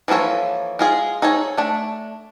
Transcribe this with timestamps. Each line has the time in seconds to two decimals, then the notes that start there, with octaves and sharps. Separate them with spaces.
0.08 E3 F3 A#3 A4 C#5
0.79 G#3 F4 G#4
1.22 D#4 G#4 A4 C#5
1.58 A3 D4